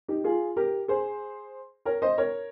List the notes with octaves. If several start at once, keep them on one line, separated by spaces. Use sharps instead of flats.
D#4 G4
F4 G#4
G4 A#4
G#4 C5
A#4 C#5
C5 D#5
A#4 C#5